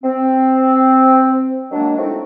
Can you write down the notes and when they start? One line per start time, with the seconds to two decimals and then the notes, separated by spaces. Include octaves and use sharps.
0.04 C4
1.71 D#3 F#3 G#3 A#3 D4
1.98 A3 C4 D#4 E4 F#4